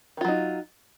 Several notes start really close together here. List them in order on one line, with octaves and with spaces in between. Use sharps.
D#3 F4 F#3 D#4